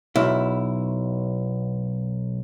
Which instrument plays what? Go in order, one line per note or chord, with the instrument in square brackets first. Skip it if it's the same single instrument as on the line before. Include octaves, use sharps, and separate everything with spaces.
[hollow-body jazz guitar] B1 E4